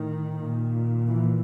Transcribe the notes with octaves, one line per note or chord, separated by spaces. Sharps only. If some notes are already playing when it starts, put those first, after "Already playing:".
Already playing: A2 D#3
A#2
E3